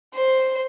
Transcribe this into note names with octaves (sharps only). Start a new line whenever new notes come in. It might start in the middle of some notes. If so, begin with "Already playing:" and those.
C5